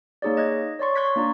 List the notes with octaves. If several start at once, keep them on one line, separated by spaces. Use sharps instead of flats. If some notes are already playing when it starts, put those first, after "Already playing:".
A#3 D#4 G#4 C#5 D5
D#5 F#6 G#6
C#5 D5 C6 C#6
C6 C#6 F#6 G#6 B6
A#3 D4 F4 D5 A#5